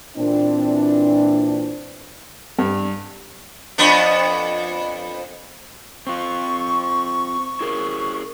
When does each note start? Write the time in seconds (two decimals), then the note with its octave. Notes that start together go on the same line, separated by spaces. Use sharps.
0.17 A#2 E3 C4 D4
2.59 G2
3.78 F2 B3 D4
6.07 C4 F4 C#6
7.61 E4 G#4 A#4